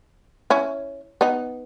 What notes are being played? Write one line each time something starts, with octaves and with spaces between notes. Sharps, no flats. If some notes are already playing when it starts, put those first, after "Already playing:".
C#4 E4
B3 D#4